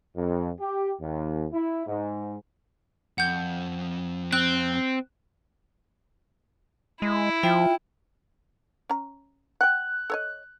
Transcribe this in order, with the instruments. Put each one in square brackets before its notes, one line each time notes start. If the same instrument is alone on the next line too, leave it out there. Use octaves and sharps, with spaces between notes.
[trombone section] F2
G4
D#2
E4
G#2
[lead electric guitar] F2 [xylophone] F#5 G6
[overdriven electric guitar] C4 [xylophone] F#6
[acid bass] G#3 [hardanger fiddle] E4
[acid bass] F3 [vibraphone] F4 E5 [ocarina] G5
[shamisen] C#4 A#5
[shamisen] F#5 G5 [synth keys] F#6
[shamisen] A4 C#5 D#5